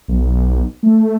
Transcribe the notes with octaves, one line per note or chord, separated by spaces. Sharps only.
B1
A3